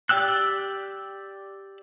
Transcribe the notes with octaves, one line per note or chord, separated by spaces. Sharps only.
G4 D5 G5 E6 F#6